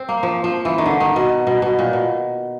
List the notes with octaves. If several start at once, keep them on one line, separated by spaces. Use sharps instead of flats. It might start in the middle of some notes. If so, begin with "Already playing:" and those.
Already playing: C4
A#3
F3
F3
E3
D#3
D3
D#3
B2
B2
B2
A#2
B2